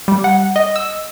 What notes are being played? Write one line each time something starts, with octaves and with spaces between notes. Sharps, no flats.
G3
F#5
D#5
E6